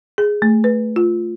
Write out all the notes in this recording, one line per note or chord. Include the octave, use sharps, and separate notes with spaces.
G#4
A3
B4
F4